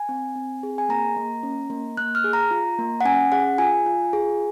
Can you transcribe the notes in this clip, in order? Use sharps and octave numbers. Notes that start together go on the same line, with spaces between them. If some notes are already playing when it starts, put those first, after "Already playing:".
Already playing: G#5
C4
C4
G#4
G#5
A#3 A#5
A#3
C#4
A#3
A#3 F#6
F6
G#4
A#5
F4
A#3
F#5
C#4 G#5
G#4 F#5
F4 G#5
F4
G#4